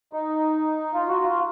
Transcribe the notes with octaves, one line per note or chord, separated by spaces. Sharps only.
D#4
F4
F#4
F4